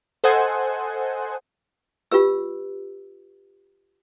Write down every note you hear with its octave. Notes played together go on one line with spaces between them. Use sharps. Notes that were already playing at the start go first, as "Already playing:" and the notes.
A4 C5 D#5 F#5 G#5
F4 G4 B4 E6